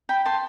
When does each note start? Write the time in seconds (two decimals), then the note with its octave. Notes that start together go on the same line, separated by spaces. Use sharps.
0.09 G5 B5
0.25 A5 C6